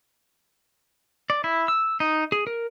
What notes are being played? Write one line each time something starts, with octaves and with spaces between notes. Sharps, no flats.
D5
E4
E6
D#4
G#4
A#4